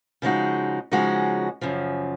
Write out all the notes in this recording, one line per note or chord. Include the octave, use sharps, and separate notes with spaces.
C#3 F3 G#3 D#4 F#4
C#3 F3 G#3 D#4 F#4
F#2 C#3 F3